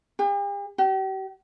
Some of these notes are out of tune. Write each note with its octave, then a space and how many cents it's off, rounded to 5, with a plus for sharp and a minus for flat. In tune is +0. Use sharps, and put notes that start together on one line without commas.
G4 +45
G4 -40